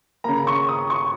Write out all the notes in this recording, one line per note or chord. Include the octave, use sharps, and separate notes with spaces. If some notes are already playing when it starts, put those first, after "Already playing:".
C#3 A#3 A#5
C#6
D#6
C#6